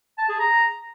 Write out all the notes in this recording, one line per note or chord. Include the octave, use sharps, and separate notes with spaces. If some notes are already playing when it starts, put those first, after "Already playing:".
A5
G#4
A#5